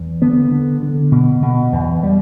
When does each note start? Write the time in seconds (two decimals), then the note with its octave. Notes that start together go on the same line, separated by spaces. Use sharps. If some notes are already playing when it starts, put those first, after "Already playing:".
Already playing: E2
0.22 D3 B3
0.51 D3
0.82 D3
1.12 B2
1.42 B2
1.73 E2
2.03 G3